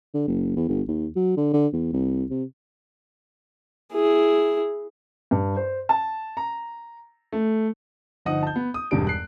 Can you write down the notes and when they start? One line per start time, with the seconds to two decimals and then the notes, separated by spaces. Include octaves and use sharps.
0.14 D3
0.28 F#1
0.56 E2
0.69 G1
0.88 D#2
1.16 F#3
1.37 D3
1.53 D3
1.73 E2
1.93 C2
2.30 C3
3.93 E4 G#4
5.31 G2
5.56 C5
5.89 A5
6.37 A#5
7.32 A3
8.26 G1 F3 D#4 D#5 F#5 D#6
8.43 A5 G6
8.56 B3
8.74 D#6
8.91 E1 G2 G3 D7
9.07 F#6 C7